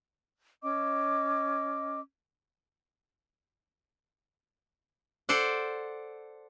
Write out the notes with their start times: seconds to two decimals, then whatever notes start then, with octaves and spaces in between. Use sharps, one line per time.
0.62 C#4 D#5 D6 E6
5.29 A4 C5 D5 F#5